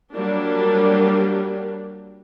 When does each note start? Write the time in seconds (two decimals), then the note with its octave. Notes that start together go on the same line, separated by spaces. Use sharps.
0.12 F#3 G3 A#3 D4 G4